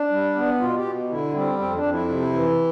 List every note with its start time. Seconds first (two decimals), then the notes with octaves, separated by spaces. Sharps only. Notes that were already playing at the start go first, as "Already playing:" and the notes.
Already playing: D4
0.10 G3
0.35 B3
0.60 B2 F4
0.76 G4
0.84 B2
1.10 D3 E4
1.34 G3 C4
1.59 F2 C4
1.75 D4
1.83 F2
1.92 E4
2.08 C3
2.33 E3